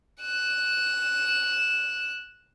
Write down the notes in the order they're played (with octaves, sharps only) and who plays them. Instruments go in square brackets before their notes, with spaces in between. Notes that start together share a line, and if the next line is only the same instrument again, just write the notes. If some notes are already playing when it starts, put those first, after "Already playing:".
[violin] F#6 E7